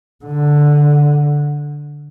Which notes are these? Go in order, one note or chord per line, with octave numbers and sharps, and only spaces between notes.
D3